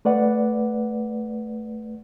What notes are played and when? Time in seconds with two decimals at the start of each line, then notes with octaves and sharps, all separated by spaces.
0.05 A3 B4 D5 F#5